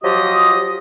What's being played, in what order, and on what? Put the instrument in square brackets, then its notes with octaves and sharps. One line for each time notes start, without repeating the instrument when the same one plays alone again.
[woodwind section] F3 F#3 F4 G4 D#5 D#6